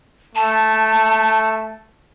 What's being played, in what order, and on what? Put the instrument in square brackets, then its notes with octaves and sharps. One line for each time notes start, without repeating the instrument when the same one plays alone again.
[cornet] A3 [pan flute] A5